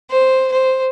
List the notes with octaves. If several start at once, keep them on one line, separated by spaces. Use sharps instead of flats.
C5
C5